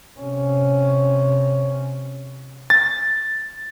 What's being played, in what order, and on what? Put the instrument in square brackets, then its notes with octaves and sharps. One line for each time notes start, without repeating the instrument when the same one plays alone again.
[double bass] C3 C#4
[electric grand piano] A6